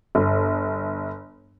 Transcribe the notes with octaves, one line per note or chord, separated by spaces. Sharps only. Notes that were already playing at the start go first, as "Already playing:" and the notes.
G1